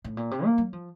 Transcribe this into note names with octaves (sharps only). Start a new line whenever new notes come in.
A2
A#2
C3
A#3
F#3
F3